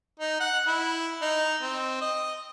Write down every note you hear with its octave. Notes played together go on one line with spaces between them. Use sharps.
D#4
F#5
E4
D#4
C4
D#5